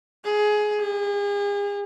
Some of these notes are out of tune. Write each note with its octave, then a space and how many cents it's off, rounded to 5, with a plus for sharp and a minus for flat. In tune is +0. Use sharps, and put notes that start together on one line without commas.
G#4 +15
G#4 -40